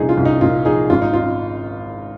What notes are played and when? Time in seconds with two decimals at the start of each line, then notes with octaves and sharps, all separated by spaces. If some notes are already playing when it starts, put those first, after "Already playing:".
Already playing: C2 A#2 F3 D#4 G#4
0.09 F4
0.17 C2
0.25 D#4
0.41 A#2 F4
0.65 F3 D#4 G#4
0.90 G#1 F4
1.02 D#4
1.13 F4